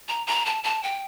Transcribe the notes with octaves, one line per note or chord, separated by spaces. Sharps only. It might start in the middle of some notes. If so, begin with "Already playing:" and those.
A#5
A#5
A5
A5
G5